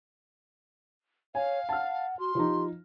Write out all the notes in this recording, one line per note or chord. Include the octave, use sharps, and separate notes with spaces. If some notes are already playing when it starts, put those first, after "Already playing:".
C#5 F5 G#5
F#5 A5 F6
F#4 C6
F3 D#4 G4